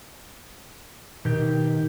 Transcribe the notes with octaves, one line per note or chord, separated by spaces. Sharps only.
B2 D#3 G4